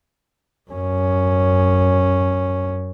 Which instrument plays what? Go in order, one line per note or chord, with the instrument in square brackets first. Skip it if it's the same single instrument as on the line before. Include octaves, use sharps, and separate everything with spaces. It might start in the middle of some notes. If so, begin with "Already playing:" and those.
[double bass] F#2 C#4